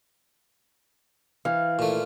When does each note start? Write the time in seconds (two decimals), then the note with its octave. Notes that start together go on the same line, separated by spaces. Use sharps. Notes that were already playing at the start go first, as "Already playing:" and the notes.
1.45 E3 F5
1.79 A#2 A3